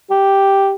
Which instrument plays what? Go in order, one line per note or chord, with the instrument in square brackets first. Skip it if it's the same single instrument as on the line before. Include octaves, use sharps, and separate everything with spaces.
[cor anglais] G4